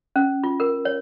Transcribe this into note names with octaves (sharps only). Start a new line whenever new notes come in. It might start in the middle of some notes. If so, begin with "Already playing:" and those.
C#4
F4
A#4
C#5